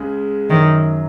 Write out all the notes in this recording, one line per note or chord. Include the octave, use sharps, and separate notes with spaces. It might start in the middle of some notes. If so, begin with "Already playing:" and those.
Already playing: C#2 C#3 G#3
F#2 D#3 F#3 D#4